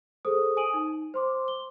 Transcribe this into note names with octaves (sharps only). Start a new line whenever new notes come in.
G#4 A4 C5 D#6
G#5 D#6 D7 D#7 F#7
D#4
C5 C6 D6
G7